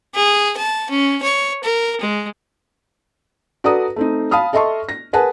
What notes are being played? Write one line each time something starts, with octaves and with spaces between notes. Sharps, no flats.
G#4
A5
C#4
C#5
A#4
G#3
F#4 A4 B4 D5 A#5 D#6
A3 C4 D#4
F5 A5 B5 D#6 F6
A4 D#5 E5 A5 C6 C#6
A#6
G#4 A#4 B4 F#5 G#5 A5